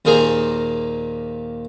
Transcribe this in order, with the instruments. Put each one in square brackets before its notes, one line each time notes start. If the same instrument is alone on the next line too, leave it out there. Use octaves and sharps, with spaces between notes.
[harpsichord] D#2 A#2 A#3 G#4 C5 A#5